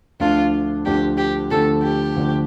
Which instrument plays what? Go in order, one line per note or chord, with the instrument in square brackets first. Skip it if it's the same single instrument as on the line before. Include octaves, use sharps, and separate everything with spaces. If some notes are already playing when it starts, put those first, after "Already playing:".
[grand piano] D2 D3 F3 A3 D4 [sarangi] F4
[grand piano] D2 D3 F3 A3 D4 [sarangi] G4
[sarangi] G4
[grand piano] D2 D3 F3 A3 D4 [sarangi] A4
[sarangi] G4
[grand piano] D2 D3 F3 A3 D4